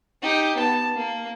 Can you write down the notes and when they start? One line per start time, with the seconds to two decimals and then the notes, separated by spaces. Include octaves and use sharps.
0.22 D#4 G4
0.56 B3 A5
0.95 A#3